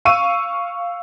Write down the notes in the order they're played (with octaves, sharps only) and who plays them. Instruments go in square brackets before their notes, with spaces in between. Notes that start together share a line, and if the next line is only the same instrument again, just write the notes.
[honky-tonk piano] F5 C#6 E6 D#7